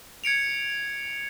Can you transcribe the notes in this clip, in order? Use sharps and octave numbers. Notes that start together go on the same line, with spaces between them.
G#6 C#7 D7 F7